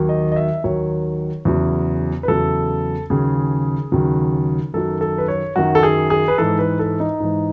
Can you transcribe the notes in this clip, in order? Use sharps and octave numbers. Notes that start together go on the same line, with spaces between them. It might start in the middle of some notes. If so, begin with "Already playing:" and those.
Already playing: D#2 D#3 F#3
D#5
D#5
E5
D#2 D#3 F#3 C#5
E2 C#3 F#3
B4
E2 C#3 F#3 A4
D#2 C#3 F#3 G#4
D#2 C#3 F#3
F#2 D#3 F#3 A4
A4
B4
C#5
F#2 D#3 F#3 F#4
A4
G#4
G#4
B4
G#2 E3 A4
B4
A4
D#4
G#2 E3